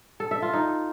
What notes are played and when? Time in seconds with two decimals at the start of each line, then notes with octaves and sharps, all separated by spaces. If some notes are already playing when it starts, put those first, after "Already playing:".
0.20 A4
0.31 E5
0.42 F4
0.53 D#4